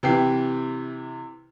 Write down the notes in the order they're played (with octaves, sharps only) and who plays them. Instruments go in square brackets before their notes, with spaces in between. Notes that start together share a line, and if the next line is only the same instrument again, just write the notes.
[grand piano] C3 E3 G5 C7